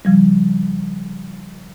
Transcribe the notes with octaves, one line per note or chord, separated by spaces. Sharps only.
C#3 F3 G3